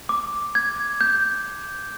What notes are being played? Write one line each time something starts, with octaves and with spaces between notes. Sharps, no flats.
D6
G#6
G6